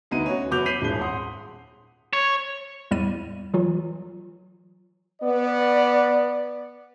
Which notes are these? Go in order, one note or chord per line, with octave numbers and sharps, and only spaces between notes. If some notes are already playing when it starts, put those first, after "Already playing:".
D2 B3 D#4 F#4 D#7
C#4 F#4
F#1 B3 F#4 D6 G6 F7
G6 B6 C7 D#7 F7 F#7
D#1 G#1 G#4 G7
F#5 C6 D#6
C#5
E2 A2 G3 B3 D5 D#7
E3 F#3 F4
B3 D5